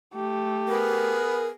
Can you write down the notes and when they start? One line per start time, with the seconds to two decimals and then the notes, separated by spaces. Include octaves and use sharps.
0.15 A3 G4
0.68 B3 G#4 A#4 B4